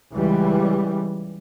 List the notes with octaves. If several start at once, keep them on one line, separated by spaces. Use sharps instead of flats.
C#2 E3 G3